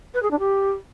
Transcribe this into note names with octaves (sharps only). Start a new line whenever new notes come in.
B4
G#4
D4
G4